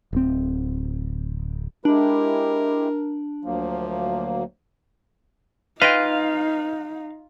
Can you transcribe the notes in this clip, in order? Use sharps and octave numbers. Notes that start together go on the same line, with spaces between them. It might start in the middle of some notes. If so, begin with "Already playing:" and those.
D1 C4
G#3 D4 E4 G4 A#4
D2 F3 F#3 A#3
D#4 F4 B4 D#5 F5 G5